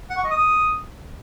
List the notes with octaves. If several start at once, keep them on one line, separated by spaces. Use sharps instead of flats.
F#5
C#6
D#5
D#6